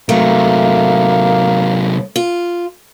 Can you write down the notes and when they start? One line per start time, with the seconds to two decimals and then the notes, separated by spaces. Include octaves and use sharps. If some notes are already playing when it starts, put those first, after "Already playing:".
0.09 C3 F#3 A3 A#3
2.16 F4